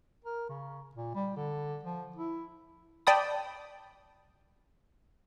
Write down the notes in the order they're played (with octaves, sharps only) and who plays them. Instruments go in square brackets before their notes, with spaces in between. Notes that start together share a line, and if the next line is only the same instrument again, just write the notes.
[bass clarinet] A#4
C#3
A#2
G3
D3
F3
E4
[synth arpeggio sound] D5 G5 A5 B5 D#6